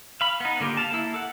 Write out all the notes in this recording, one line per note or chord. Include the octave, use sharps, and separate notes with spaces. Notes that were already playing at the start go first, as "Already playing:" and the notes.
F5 B5
B3 D#4
D3 A#3 F4 G4
F5 A5
A#3 E4
A4 F#5